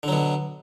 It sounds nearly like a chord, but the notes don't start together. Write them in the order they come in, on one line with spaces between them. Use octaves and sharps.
D3 F#3 B2